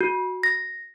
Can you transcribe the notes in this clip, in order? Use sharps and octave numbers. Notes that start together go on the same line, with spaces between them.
F#4
A#6